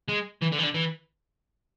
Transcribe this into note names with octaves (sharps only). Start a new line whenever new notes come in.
G#3
E3
D3
E3
D3
E3